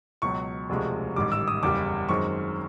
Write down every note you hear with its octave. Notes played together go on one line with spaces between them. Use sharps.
C#2 B2 F#3 C#6
E1 D2 C3 F3 G#3
A1 G#2 D#3 G3 D6
E6
D#6
F#1 E2 C#3 E3 G3 D6
F#2 D#3 G#3 C4 C#6